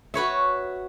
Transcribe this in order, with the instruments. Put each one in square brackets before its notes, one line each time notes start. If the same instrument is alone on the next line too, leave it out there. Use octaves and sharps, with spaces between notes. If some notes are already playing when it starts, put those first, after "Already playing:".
[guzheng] F#4 B4 C#5 E5